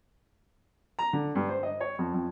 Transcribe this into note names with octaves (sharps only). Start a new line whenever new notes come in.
A#5
D3
G2
C5
D#5
C#5
F2
F2